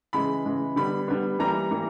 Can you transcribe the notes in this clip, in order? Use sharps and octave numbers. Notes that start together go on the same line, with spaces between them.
C#3 E3 G#3 B5
C#3 E3 G#3
D3 G3 B3 B5
D3 G3 B3
E3 G3 A#3 A#5
E3 G3 A#3